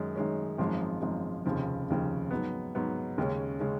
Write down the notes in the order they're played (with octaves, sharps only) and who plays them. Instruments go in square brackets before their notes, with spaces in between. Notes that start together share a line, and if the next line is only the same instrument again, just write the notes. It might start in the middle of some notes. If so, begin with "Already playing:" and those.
Already playing: [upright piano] F#2 D#3 G#3 C#4
F#2 D#3 G#3 C#4
G#1 F#2 F3 G#3 D#4
G#1 F#2 F3 G#3 D#4
F1 D#2 C#3 F3
F1 D#2 C#3 F3
G#2 F#3 B3
G#2 F#3 B3
D#2 C#3 G#3 C#4
C#3 G#3 C#4